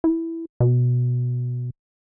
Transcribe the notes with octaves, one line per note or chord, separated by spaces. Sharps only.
E4
B2